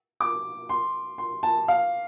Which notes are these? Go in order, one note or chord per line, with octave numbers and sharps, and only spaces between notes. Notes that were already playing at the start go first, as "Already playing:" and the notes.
D6
C6
C6
A5
F5